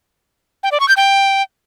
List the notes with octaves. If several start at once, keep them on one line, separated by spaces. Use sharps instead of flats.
G5
D5
C#6
G6
G5